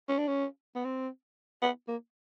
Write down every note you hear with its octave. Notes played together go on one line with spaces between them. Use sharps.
C#4
D4
C#4
B3
C4
B3
A#3